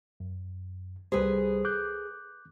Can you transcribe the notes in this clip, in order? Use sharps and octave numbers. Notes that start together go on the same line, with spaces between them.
F#2
C2 G3 G#4 A4 B4 C5
D6 F#6 G6